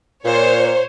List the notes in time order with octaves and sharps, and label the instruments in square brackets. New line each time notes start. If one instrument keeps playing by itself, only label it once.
[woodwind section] A#2 [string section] C5 C#5